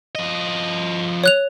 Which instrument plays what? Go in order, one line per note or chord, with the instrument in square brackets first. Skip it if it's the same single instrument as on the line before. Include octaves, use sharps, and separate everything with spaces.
[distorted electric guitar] F3 D#5
[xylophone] C#5 F#6 F7